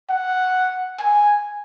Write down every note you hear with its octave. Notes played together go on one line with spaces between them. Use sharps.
F#5
G#5